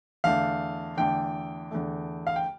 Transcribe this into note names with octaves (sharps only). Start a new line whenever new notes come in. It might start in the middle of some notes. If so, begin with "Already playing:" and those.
E2 D3 A3 F5
E2 D3 A3 G5
E2 D3 A3
F5
G5